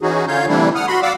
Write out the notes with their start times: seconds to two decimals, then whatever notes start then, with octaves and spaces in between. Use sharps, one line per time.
0.01 E3 C#4 D#4 F#4 G#4
0.28 D3 C#4 F4 C#5 F5 G6
0.48 C3 E3 G3 A3 D4 E4
0.75 F#5 D#6 F6
0.87 F#4 B5 C6
1.02 D5 F5 F#5 D6 E6